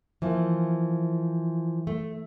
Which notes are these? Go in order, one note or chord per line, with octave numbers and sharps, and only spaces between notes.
E3 F3 A#3
A3